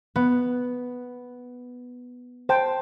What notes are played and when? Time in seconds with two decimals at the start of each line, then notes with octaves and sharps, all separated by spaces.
0.16 B3
2.49 C5 G5 A5